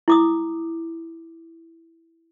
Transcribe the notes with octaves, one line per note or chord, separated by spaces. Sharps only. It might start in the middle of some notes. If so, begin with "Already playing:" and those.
E4 D6 D#6